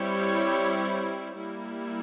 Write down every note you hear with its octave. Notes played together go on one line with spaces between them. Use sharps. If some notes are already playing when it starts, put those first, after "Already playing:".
Already playing: G3 C4 E4 G4 C#5
G3 A#3 E4